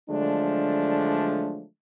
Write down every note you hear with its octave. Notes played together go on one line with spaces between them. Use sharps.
D3 F3 F#3 G#3 A3 D4